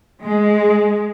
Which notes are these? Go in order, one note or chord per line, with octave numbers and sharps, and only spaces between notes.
G#3